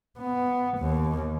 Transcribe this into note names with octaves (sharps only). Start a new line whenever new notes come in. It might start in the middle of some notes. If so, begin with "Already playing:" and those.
B3
D#2